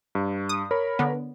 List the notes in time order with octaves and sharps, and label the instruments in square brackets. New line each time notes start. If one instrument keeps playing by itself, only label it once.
[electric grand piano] G2
[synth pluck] D#6
[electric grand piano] A#4 C#5 B5
[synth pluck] D3 B3